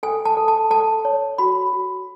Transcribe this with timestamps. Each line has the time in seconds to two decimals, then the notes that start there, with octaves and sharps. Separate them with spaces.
0.03 A4 G#5
0.25 A5
0.37 A4
0.48 A5
0.71 A4 A5
1.05 C#5
1.38 F#4 B5
1.73 F#4